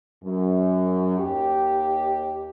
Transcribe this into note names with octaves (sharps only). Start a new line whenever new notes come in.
F#2
D#2 G4